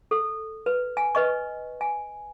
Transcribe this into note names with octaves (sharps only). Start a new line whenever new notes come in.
A4
B4
G#5
B4 D#5 C#6
G#5